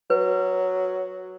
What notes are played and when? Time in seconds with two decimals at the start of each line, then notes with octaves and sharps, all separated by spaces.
0.10 F#3 B4